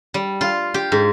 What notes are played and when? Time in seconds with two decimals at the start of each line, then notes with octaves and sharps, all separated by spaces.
0.14 G3
0.41 F4
0.74 G4
0.92 G#2